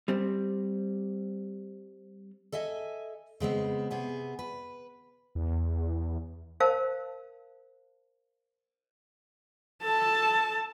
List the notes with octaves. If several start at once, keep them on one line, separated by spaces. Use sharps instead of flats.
G3 C4
A4 D#5 E5 G#5
C#3 G#3 B3 C4
C3 B3 G#4
B4
E2
A#4 C5 F5 A5
A4 A5